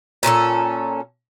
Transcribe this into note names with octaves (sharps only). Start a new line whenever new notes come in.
A#2 C#4 F4 A4